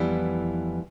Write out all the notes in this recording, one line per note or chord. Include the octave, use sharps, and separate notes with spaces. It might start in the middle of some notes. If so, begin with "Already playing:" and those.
Already playing: F2 E3 G3 B3 E4